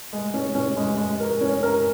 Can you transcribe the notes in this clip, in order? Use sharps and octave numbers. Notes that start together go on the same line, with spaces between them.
G#3
C#4
C#4
G#3
G#3
A#4
C#4
A#4